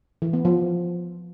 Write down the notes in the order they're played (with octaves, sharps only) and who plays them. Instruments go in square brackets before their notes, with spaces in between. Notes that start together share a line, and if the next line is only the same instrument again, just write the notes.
[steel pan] E3
B3
F3